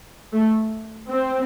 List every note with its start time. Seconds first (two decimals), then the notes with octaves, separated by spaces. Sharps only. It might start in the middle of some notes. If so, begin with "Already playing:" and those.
0.33 A3
1.09 C4